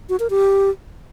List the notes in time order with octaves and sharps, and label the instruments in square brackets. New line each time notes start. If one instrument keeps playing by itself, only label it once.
[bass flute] F#4
A#4
G4